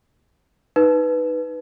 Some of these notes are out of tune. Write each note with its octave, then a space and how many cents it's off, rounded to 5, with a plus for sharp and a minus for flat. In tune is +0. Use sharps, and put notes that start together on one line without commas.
D#4 +0 B4 +0